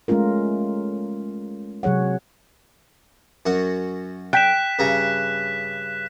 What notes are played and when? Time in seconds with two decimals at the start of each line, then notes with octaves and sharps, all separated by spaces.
0.08 G#3 A3 C#4 F4 A#4
1.83 C3 F#3 G#4 C#5 F#5
3.46 F#2 F#4
4.33 G5 F#6 B6 E7
4.79 G2 C#3 A#5